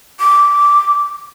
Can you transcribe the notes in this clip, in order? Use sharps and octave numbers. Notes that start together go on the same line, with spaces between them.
D6